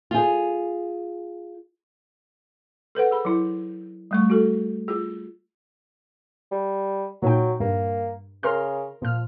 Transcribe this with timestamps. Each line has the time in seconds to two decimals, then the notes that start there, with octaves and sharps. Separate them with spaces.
0.11 F4 G#4
2.95 A4 B4 C5 F#5
3.11 G#4 B5
3.25 F#3 E4
4.11 G3 A3 C#6
4.30 F#4 A4
4.88 F4 G#4
6.51 G3
7.23 A#2 F#3 D#4 G5
7.60 G2 A#3
8.43 C#3 A#4 C6 F6
9.02 A#2 F3 F6